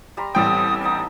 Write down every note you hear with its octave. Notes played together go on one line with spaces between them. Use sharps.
G3 A#5 C6
A1 G3 A3 B3 C4 G5 D#6
B3 D#4 A5 D#6